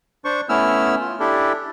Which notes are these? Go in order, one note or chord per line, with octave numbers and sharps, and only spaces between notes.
D4 C5 C#6
A3 B3 C#4 E4 E6 F6
F4
D4 E4 G4 A4